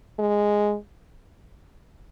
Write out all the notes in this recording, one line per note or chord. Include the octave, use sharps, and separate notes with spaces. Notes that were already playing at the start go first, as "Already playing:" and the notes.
G#3